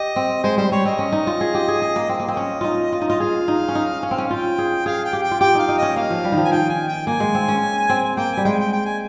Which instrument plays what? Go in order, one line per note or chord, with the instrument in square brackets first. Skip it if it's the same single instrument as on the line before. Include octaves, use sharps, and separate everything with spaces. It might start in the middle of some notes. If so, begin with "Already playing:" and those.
Already playing: [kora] G4 [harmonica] D#5
[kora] C4
[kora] G#3 [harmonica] C5
[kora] G3 [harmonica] C5
[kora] G3 [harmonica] C#5
[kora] C4 [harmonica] D#5
[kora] C#4
D#4
F4
G#4
G4
G#4
G#4
A#3
[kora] C4 [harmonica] D#5
[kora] A#3
C4
C#4
D#4 F4
F4
D#4
[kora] F4 [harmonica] D#5
[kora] G#4 [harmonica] F5
[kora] D#4
C#4
D#4
C#4
C4
C#4
[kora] F4 [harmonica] G5
[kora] G#4
[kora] G#4 [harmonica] F5
[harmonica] G5
[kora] G4
[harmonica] G5
[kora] F4
[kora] G4 [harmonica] G5
[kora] D#4 [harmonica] F5
[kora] D#4
[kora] C#4 [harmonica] D#5
[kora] A#3 [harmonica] F5
[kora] F3
G3
D#3
F3
[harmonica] G#5
[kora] D#3 [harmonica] G5
[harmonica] G#5
G5
[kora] A#3 [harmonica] G#5
[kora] G#3
C4
C#4
C4
[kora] A#3 [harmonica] G5
[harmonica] G#5
[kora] G3
[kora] G#3 [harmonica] G5
[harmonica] G5
G5
G#5